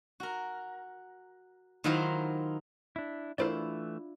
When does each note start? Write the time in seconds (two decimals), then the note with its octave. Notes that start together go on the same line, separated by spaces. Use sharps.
0.20 F#4 A#4
1.84 D#3 F#3 E4 F4 A#4 C5
2.96 D4 E4
3.38 E3 A3 D4 E4 F4 A#4 C5 D5